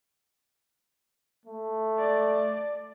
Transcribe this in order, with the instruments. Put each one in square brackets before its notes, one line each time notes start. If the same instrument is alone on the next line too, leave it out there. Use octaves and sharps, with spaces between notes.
[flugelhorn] A3
[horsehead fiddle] D5